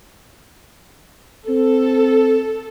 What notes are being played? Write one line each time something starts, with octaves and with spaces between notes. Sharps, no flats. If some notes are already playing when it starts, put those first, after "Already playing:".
C4 A4